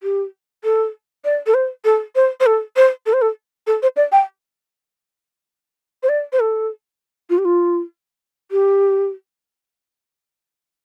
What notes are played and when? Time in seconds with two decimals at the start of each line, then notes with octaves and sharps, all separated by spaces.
0.03 G4
0.64 A4
1.25 D5
1.47 A4
1.54 C5
1.85 A4
2.16 C5
2.40 C5
2.46 A4
2.76 C5
3.06 A4
3.13 C5
3.22 A4
3.67 A4
3.82 C5
3.96 D5
4.12 G5
6.03 C5
6.09 D5
6.33 C5
6.40 A4
7.30 F4
7.38 G4
7.45 F4
8.51 G4